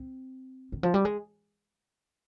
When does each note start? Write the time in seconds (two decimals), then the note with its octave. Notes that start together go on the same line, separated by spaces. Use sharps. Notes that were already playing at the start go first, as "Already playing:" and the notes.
Already playing: C4
0.72 D#3
0.83 F3
0.94 G3
1.05 G#3